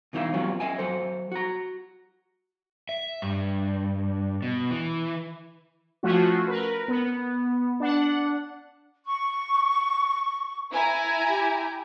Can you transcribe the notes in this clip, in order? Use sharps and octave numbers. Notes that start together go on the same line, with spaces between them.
B2 E3 D#4 C5 E5 F5
F#3 G3 B3 C#4 F4
D#5 E5 G#5
F#3 A4 C5
F#4 A#5
E5
G2
B2
E3
F3 A3 C#4 F4 F#4
A#4 B4
B3
D4 F#5
C#6
E4 G#5 A#5
G4